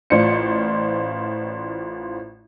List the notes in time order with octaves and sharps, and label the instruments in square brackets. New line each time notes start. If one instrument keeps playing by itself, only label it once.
[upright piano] A1 F4 C5 D5 C#7